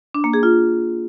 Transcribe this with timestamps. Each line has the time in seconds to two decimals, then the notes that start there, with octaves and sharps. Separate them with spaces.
0.15 D4
0.24 A#3
0.33 G#4
0.43 F4